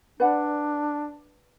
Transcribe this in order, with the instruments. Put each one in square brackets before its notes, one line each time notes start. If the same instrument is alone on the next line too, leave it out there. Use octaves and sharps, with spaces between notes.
[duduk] D4 [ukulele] B4 D5 F#5